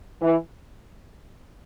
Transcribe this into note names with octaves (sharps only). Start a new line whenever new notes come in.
E3